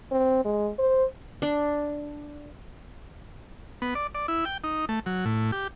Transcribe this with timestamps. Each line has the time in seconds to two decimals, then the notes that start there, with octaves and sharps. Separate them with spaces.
0.12 C4
0.45 G#3
0.79 C5
1.42 D4
3.82 B3
3.95 D5
4.15 D5
4.28 E4
4.45 G5
4.64 D#4
4.89 A3
5.06 F#3
5.25 A2
5.52 G4